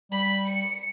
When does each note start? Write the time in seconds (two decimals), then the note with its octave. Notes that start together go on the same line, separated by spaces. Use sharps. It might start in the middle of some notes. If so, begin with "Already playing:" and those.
0.12 G3 B5 B6
0.46 C#7